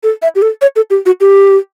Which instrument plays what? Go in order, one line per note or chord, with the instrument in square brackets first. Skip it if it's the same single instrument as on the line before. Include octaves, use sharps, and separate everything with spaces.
[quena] A4
E5
G4
A4
C#5
A4
G4
F#4
G4